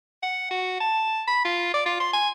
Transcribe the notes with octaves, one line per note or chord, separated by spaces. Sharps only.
F#5
F#4
A5
B5
F4
D5
F4
C6
G#5